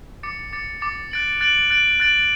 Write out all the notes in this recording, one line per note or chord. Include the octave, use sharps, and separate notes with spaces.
D6 A6 C#7
D6 A6 C#7
D6 A6 C#7
F#6 A6 D7 F#7
F#6 A6 D7 F#7
F#6 A6 D7 F#7
F#6 A6 D7 F#7